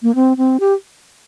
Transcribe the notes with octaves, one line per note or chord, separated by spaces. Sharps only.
A#3
C4
C4
G4